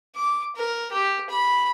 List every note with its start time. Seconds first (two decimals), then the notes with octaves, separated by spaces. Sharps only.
0.16 D6
0.55 A#4
0.92 G4
1.30 B5